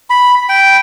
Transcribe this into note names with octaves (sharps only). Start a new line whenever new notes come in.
B5
G5